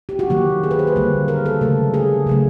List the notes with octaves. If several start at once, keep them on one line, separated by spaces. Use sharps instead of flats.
G4
F#4
D#3 F#3 A#3 G4
G#4
B4
C5
B4
D3 G3 A#3
A#4
A4
C#3 F#3 A3
G#4
C#3 F#3 A3